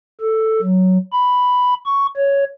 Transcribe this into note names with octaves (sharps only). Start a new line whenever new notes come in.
A4
F#3
B5
C#6
C#5